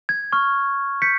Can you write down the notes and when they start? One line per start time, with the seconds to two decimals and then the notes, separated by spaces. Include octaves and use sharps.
0.09 G#6
0.32 C#6 F6
1.02 G6 B6 C#7